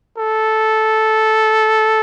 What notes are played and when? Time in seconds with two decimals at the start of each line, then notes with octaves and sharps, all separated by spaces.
0.17 A4